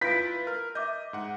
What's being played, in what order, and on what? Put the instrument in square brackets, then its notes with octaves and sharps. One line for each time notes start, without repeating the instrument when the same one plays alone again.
[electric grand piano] E4 F4 B4 [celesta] G6 D7 [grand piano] B6
[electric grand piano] A#4 [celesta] F6
[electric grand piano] D#5 [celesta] E5 D6 G6
[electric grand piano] G#2 F#5